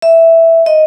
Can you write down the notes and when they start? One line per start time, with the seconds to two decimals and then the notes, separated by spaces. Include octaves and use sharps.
0.02 E5
0.66 D#5